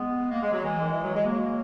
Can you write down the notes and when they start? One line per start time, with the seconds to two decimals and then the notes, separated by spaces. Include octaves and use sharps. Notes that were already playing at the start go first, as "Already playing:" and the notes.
Already playing: G#3 B3
0.31 A#3
0.42 G#3
0.52 F#3
0.63 E3 G#3
0.81 D#3
0.92 E3
1.03 F#3
1.14 G#3
1.25 F#3 A#3